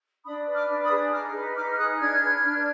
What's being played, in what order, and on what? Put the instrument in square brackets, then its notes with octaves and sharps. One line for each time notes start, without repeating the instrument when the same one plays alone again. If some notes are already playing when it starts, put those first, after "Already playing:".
[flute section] D4 B5 D#6
B4
D6 F6
D4
B5 D#6
G#4
D#4 D6 F6
B4
D#4 D6 F6
F6
G#4 D#6 F#6
D4 F6 G#6
B4
D4